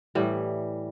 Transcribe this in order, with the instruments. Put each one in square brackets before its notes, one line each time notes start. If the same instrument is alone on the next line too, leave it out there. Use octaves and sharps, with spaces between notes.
[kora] A2 E3 G3